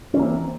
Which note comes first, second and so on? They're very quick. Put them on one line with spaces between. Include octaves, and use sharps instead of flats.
C#4 E3 A#3 C4